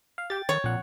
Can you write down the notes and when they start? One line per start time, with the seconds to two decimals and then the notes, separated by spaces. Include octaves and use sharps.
0.18 F5
0.30 G4 G5 A6
0.49 D#3 C#5
0.64 A#1 F2 A#2 F#5